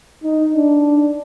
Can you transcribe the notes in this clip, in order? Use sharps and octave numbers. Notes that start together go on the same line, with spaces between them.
D#4
D4